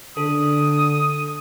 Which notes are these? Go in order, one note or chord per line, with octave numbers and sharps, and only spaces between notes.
D3 A4 D#6